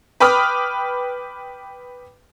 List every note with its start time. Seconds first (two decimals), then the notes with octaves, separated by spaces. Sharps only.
0.20 B4 G5 B5 D6 D#6 F6